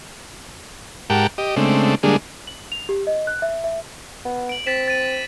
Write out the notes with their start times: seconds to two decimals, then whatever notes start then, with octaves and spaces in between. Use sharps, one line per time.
1.10 G#2 G4 A#4 F#5 G5 A5
1.38 G4 D#5
1.56 C#3 G#3 A3 C4 D4
2.03 D3 G3 G#3 A#3 D4 G#4
2.47 F#7
2.72 F7
2.89 G4
3.07 D#5
3.27 F#6
3.42 E5
3.64 E5
4.25 B3
4.49 D7 F#7
4.66 C4 A6 B6 E7
4.88 A6 D#7